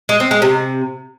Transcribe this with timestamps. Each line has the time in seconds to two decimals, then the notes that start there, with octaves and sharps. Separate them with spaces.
0.09 G#3
0.20 C4
0.31 G#3
0.42 C3